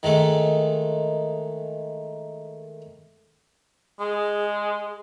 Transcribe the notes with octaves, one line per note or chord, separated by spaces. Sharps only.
D#3 G#3 A3
G#3 G#4